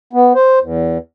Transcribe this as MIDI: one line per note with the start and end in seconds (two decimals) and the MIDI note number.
0.13 0.33 59
0.35 0.59 72
0.62 0.98 40